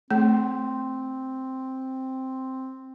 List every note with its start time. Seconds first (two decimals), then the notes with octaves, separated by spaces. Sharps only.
0.11 A3 C4